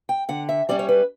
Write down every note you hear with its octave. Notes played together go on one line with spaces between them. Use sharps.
G5
D3 F#5
E5
G3 C#4 D5
C#5
B4